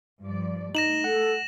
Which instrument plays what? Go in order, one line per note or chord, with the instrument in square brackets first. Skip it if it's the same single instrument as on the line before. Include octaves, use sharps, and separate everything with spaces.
[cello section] G2 F3 D5
[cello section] A3 [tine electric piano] D#4 [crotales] A#6 E7 F#7
[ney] A4 [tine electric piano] F#5